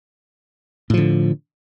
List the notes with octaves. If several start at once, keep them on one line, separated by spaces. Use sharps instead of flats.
A2 D3 F3